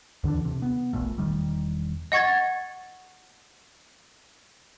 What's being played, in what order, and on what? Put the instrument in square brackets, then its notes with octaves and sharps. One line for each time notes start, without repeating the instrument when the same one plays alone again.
[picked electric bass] D#2 D3 E3 D4
C3
B3
D1 A#1 A#2 A3
E1 D#3 G3
[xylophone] D#5 F#5 C#6 G#6 A6